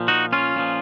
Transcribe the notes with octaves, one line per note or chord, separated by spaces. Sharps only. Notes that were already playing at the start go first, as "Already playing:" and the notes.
Already playing: A#2 F3
D#4 F#4
C#4 F4
A#2 F3